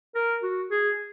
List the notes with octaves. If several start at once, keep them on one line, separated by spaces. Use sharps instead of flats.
A#4
F#4
G#4